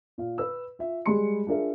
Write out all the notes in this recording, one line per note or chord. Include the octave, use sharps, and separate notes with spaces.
A#2 F5
B4 E6
F4 E5
G3 G#3 G#4 B5 C6 C#7
D4 F4 G#4 A#4 E5